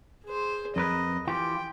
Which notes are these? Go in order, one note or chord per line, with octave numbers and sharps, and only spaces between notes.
G#4 C5
F2 A#4 B4 D#5
E3 F4 G4 G5